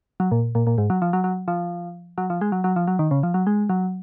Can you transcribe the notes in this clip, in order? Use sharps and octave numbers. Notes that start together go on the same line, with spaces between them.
F#3
A#2
A#2
A#2
G#2
F#3
F3
F#3
F#3
F3
F#3
F3
G#3
F#3
F#3
F3
F#3
D#3
C#3
F3
F#3
G#3
F#3